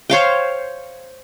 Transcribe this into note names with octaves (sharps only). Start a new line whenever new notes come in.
C5 C#5 F5 G5